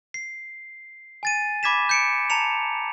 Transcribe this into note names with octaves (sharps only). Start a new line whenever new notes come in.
C7
G#5 A6 D#7
B5 D6 G#6 B6 E7
G6 C#7 D7
A5 A#5 C#7 F7